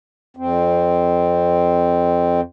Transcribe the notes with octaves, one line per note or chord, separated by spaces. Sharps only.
F2 C4